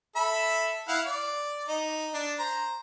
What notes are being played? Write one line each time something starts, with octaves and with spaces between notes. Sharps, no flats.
A4 E5 B5
E4 F5 F#5
D5
D#4
D4
C5 A#5